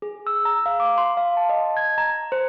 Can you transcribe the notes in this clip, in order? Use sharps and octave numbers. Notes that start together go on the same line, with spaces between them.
G#4
E6
A#5
F5
D6
C6
F5
A5
D#5
G#6
A#5
C5